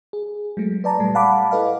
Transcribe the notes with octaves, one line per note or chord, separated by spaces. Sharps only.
G#4
F#3 G#3 A3
B4 D5 A5 A#5
A#2 G3 A3
F5 F#5 A5 B5 D6
E4 A4 B4 D#5 F5